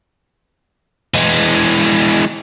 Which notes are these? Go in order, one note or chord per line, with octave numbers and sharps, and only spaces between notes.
E3 G#3